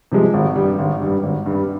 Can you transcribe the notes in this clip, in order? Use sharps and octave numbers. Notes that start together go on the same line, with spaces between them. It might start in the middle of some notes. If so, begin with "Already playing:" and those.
C3 F3 G#3
G#1
G2 G3
G#1
G2 G3
G#1
G2 G3